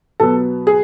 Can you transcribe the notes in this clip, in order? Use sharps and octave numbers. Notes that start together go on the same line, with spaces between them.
B2 F#3 B3 A4
G#4